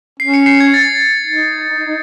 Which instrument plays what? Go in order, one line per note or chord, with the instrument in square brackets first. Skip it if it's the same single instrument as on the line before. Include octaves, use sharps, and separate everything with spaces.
[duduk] C#4 [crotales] C7
[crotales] C#7
C7
G#6
A6
[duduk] D#4